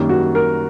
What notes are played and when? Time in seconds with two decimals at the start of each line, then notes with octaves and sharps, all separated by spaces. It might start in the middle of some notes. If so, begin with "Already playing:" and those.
Already playing: F#2 D#3 G3 A#3
0.09 F#4
0.35 A#4